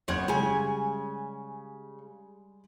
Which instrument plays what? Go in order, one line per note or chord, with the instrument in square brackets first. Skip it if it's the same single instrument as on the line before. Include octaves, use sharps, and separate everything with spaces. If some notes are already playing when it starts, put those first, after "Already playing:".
[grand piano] F#1 G#6 [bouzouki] B3 C4 C#5
[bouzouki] C#3 G#5 [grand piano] G3 G#3